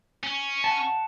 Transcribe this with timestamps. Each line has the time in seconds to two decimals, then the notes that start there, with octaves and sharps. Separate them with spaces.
0.23 C#4
0.64 F#5 A5